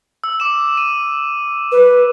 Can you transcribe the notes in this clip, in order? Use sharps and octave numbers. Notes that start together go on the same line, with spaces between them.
E6
D6 E7
D#7
B4